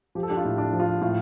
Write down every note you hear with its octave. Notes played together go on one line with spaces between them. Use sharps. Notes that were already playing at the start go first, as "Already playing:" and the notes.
F3 G4
A4
D4 G4
F4
A2
D4
F3
F4
A2 F4